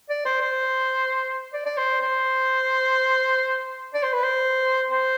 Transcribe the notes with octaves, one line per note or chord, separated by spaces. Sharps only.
D5
C5
C5
D5
D5
C5
C5
D5
C5
B4
C5
C5